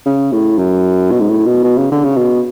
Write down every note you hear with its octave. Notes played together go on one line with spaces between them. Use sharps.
C#3
A2
F#2
B2
G#2
A2
B2
B2
C#3
D3
C#3
B2